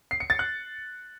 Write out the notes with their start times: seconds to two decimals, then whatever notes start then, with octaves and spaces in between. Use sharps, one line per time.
0.11 C7
0.20 C#7
0.30 A6
0.39 F#6